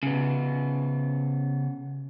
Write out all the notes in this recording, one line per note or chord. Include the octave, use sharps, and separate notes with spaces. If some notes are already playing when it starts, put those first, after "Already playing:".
C#3 B3